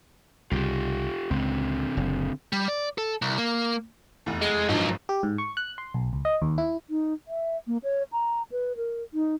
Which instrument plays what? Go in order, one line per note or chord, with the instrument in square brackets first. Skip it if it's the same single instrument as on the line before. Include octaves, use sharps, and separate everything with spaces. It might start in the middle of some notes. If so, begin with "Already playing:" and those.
[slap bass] C2 C#3 [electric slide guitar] F4 G4
[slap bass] C#2 [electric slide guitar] D3 C4
[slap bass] F#1
[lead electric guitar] G3
D5
A4
C2
A#3
[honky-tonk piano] F1 E2
[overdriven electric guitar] G#3
[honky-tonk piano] G#1 G2 F3 [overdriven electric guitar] F#3 D#4
[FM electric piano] G4
G#2
C#6
F#6
C6
B1
C#2
D#5
D#2
E4
[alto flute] D#4
E5
A#3
C#5
A#5
B4
A#4
D#4